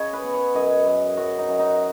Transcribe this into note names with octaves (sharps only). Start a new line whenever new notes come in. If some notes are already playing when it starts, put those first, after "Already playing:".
Already playing: C#3 G#4 C#5 D#5
B4
B3
C#5
F#2 D#5
F#2
F#2 F#4
D#4
F#2
D#4